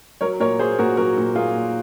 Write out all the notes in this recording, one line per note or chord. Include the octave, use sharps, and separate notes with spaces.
F#3 A#4 C#5
A#2 A#4 C#5
A#3 G#4 C5
A#2 F#4 A#4
F#3 F#4 A#4
A#2
A#3 F4 G#4
A#2